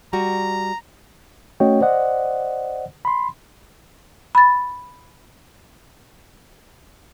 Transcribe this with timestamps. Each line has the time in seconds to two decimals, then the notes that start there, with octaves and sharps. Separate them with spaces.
0.13 G3 F#4 A#5
1.60 A3 C#4 F#4 C#5 D#5 G5
1.81 C5 D5 D#5 F#5
3.05 B5 C6
4.35 B5 A6